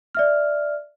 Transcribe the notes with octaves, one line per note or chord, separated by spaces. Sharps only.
D5 E5 F6